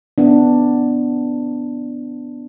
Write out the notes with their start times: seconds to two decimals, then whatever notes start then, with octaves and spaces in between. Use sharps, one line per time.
0.18 B3 D4